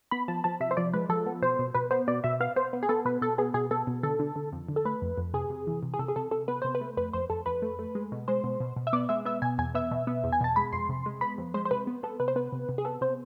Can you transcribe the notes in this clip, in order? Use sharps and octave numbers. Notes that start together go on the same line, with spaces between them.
B3 B5
F3 A5
F3 A5
C3 E5
C5
F3 D5
G#3 B4
F3 A4
B3
B2 C5
B2
B2 B4
B3 C5
B2 D5
B2 E5
B3 F5
B3 C5
B3
G#4
B3 A4
B2 B4
B2 A4
B3 G#4
B2 G#4
B3 A4
B2
D3 A4
D3
D3
F2
D3
A4
A3 B4
F2
F2
C3 G#4
C3
E3
C3
G#4
C3 A4
G#4
C3 A4
C3 A4
B3 B4
C3 C5
B4
A3
F2 B4
F2 C5
F2 A4
F2 B4
A3
A3
G#3
B2
G#3 C5
B2
B2
B2
E5
B3 D5
G#3 E5
B3 E5
B2 G#5
E2 G#5
B3 E5
B2
B3
E2
G#5
B2 A5
G#3 B5
F2 C6
C3
G#3
B3 B5
F2
G#3 C5
C5
C3 B4
B3
B3 A4
C3 B4
C5
B3 B4
C3
C3
G#4
B3 A4
C3 C5